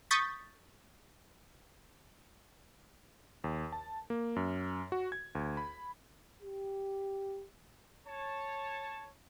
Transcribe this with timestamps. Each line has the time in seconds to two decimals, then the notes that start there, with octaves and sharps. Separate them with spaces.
0.11 C#6 D#6 G6 A6 B6
3.44 D#2
3.73 A5
4.10 A#3
4.36 F#2
4.92 F#4
5.12 G#6
5.35 D2
5.57 B5
6.43 G4
8.07 C#5 A5